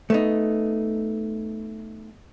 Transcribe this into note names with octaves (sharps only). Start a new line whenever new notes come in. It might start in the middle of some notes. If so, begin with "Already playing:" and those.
A3 B3 D#4